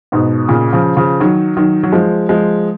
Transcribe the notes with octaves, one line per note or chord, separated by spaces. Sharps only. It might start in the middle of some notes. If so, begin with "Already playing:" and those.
G#2 B2
A#2 C#3
C#3 F3
C#3 F3
D#3 F#3
D#3 F#3
F#3
F3 G#3
F3 G#3